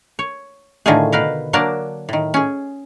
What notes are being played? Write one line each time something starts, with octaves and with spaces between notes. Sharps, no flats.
C#5
A2 D3 D#3 A3 F4 G#4
B2 A#4 B4 F5
F#3 A#3 D4 A#4 D5 A5
A2 D#3
C#4 G#4